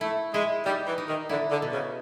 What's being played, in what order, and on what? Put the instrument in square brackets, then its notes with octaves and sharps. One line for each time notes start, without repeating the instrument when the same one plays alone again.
[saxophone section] A3 [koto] E4
[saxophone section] G#3 [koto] E4
[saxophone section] G3 [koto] D#4
[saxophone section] E3
[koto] D#4
[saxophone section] D#3
[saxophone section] D3 [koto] E4
[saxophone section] D3
[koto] B2
[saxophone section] C#3